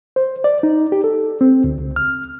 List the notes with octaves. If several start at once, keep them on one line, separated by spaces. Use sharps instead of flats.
C5
D5
D#4
G4
A4
C4
D2
C#2
F6